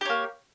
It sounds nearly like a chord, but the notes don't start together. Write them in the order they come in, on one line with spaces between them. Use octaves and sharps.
G4 C#5 A#3